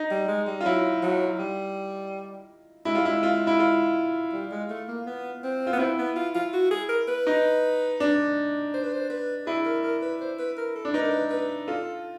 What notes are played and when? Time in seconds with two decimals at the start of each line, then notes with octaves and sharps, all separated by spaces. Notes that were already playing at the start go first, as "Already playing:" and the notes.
Already playing: D#4
0.11 G3
0.28 G#3
0.47 G3
0.61 F4
0.65 F#3 E4
1.02 F#3
1.39 G3
2.85 G#3 E4
2.95 G3 F4
3.05 G#3 E4
3.23 F4
3.47 E4
3.59 F4
4.33 G3
4.51 G#3
4.69 A3
4.88 A#3
5.06 B3
5.43 C4
5.67 F4
5.73 B3
5.79 C4 E4
5.98 B3
6.16 F4
6.35 F4
6.53 F#4
6.71 G#4
6.89 A#4
7.08 B4
7.27 D#4
8.00 D4
8.74 C5
8.84 B4
8.93 C5
9.10 B4
9.46 E4 G#4
9.66 A#4
9.83 A#4
10.02 B4
10.21 C5
10.39 B4
10.57 A#4
10.75 A4
10.85 D4
10.94 D#4 B4
11.01 A#4
11.10 B4
11.30 B4
11.68 F4 A4